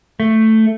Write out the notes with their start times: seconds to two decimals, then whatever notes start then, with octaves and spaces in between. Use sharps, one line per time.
0.20 A3